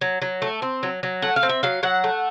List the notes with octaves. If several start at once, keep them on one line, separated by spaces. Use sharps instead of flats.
F#3
F#3
A3
C4
F#3
F#3
A3 F#5
F5
C4
E5
F#3 F5
F#3 F#5
A3